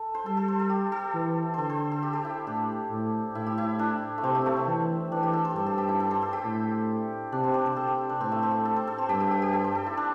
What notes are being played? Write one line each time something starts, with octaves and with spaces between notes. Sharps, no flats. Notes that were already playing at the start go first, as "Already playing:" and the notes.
Already playing: A4
C5
G3 A4
A4
C5
A4
G4
A4
E3
D3 A4 C5
C5
A4
G4
G4
E4
A2 D4
A2
A2 E4
G4
E4
D4
A3
C3 C4
A3
A3
C4
E3
E3 D4
G4
A4
C5
G2 A4
A4
G4
E4
A4
C5
A4
G4
A2
C3 D4
C4
D4
C5
C3 A4
G4
D4
A2 C4
A3
C4
A4
C5
A4
C4
G2 G4
G4
G4
G4
A4
C5
A4
E4
D4